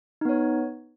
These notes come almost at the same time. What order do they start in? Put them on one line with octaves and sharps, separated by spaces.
D#4 B3 C#5